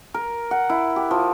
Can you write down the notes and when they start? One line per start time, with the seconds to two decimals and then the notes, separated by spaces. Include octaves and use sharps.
0.14 A#4
0.51 F#5
0.70 E4
0.96 G4
1.11 F3